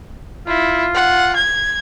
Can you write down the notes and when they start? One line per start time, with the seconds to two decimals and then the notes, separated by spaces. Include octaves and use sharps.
0.48 E4 F4
0.95 F#5
1.36 G#6